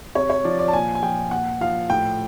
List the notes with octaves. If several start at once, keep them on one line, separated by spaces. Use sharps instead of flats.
C3 C#5
C#5
F3 D5
D5
A5
A#2 G#5
G#5
F3 G5
A#2 F#5
F3 F5
A2 G5